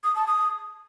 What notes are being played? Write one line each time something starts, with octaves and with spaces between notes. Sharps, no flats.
D#6
A5
D#6